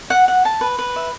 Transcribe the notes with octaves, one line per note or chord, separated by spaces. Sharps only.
F#5
F#5
A5
B4
B4
E5